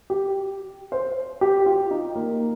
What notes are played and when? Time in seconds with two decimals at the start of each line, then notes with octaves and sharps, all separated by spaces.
0.10 G4
0.92 C5
1.41 G4
1.66 F4
1.91 D#4
2.16 A#3